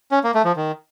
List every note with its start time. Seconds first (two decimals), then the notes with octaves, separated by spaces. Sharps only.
0.11 C#4
0.24 A#3
0.34 A3
0.45 F3
0.56 D#3